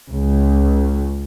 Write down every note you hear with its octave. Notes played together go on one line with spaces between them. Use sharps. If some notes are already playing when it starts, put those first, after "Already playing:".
C#2